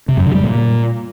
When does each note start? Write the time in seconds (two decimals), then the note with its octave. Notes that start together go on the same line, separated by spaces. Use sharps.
0.08 C3
0.17 F#2
0.26 D3
0.35 G3
0.43 A#2